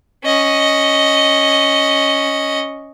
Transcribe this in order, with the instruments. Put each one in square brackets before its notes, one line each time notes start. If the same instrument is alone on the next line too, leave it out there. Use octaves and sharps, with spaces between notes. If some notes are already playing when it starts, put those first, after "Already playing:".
[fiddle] C#4 D#5